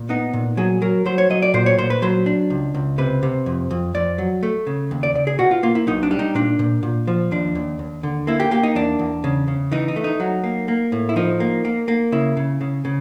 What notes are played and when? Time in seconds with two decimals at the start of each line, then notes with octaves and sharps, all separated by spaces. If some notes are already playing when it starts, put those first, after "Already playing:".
Already playing: A#2
0.09 B3 D#4
0.33 A#2
0.57 F#3 G#4
0.82 F#3 A#4
1.06 F#3 C5
1.18 C#5
1.30 F#3 D#5
1.42 D5
1.54 A#2 C5
1.66 C#5
1.78 A#2 C5
1.90 B4
2.02 F#3 C5
2.26 D4
2.50 C#2
2.74 C#2
2.98 C3 B4
3.23 C3
3.46 F2
3.71 F2
3.94 F2 D5
4.18 F#3
4.43 A3
4.67 C#3
4.91 D#2
5.03 D5
5.15 C#3 D5
5.27 G#4
5.39 B2 F#4
5.51 F4
5.63 A#3 F4
5.75 E4
5.87 B1 D#4
6.03 D4
6.11 G3
6.19 D#4
6.35 A#2 D4
6.59 A#2
6.83 A#2
7.07 F3
7.31 D#2 D4
7.55 D#2
7.79 D#2
8.03 D3
8.27 A#3 E4
8.40 G4
8.51 A#3 G4
8.63 D#4
8.75 E2 D4
8.99 E2
9.24 C#3
9.48 C#3
9.72 E3 D#4
9.88 D#4
9.96 A3
10.04 D#4
10.20 F#3
10.44 A#3
10.68 A#3
10.92 A2
11.09 E4
11.16 F3 D#4
11.40 A#3
11.65 A#3
11.88 A#3
12.12 C#3 E4
12.37 C#3
12.61 C#3
12.85 C#3